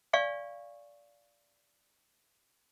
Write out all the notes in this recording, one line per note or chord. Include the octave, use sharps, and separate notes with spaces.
D5 F5 G#5 C#6